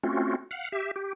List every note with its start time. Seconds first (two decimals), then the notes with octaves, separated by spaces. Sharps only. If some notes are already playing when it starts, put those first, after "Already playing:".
0.03 A3 C4 C#4 F4 F#4
0.51 F5 F#5
0.72 G4 E5
0.96 G4